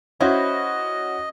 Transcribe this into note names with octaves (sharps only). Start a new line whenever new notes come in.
C#4 E4 F#4 C5 D#5